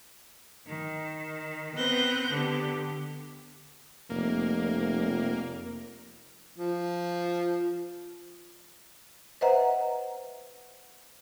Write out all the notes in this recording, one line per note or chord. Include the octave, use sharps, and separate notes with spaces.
D#3
B3 C4 B4 F#6 G6 A#6
D3 B3 G4
F1 A#3
F3
B4 C5 D#5 E5 F#5 A#5